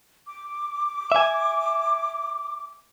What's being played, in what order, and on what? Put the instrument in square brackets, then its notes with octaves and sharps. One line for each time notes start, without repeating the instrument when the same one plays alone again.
[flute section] D6
[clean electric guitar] E5 G#5